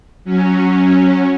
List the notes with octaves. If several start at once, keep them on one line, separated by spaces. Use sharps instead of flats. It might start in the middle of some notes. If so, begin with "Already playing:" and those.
F#3 C#4